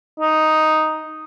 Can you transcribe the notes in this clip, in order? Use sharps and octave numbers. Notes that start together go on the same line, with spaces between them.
D#4